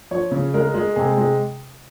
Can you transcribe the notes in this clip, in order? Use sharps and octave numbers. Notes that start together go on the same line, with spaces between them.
F3 C#5
C#3
G#3 A#4
G#3
C3 G#4
G#3